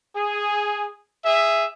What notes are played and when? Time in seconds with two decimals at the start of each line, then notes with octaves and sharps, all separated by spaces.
0.15 G#4
1.25 G#4 E5